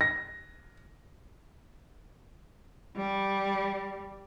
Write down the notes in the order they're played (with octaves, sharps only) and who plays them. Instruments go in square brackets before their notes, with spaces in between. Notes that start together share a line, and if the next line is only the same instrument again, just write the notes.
[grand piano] A#6
[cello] G3